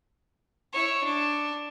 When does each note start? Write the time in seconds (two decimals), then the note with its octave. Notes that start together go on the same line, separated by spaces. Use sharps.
0.73 E4 C#5
1.04 D4